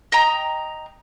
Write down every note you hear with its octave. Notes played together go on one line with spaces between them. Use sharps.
D#5 G5 A#5